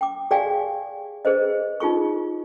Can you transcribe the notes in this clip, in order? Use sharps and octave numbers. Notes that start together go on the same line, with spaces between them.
G5 D6
G4 G#4 D5 F5 G5 G#5
G#4 B4 C5 D#5
D#4 F4 G#4 C#6